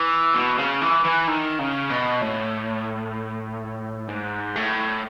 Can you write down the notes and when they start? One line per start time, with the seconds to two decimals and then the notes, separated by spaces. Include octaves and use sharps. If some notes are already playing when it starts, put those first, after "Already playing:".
Already playing: E3
0.34 B2
0.58 C#3
0.81 E3
1.05 E3
1.27 D#3
1.59 C#3
1.90 B2
2.22 A2
4.09 G#2
4.56 A2